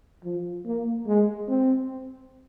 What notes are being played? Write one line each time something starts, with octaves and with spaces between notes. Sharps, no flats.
F3
A#3
G#3
C4